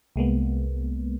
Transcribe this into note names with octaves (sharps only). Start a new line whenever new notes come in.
C2 G#3 A#3 B3